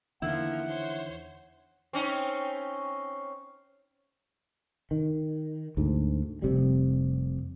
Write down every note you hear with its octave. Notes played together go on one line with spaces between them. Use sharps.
E2 D3 D#3 F3 A#3 E4 F#5
C5 C#5
C4 C#4 D#4
D#3
D2 G#2
F1 C3 G3